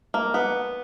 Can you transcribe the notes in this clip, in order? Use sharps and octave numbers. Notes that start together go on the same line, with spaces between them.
A#3
B3